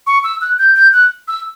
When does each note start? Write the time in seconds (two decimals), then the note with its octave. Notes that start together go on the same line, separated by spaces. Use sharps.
0.07 C#6
0.24 E6
0.41 F#6
0.59 G6
0.76 G6
0.93 F#6
1.28 E6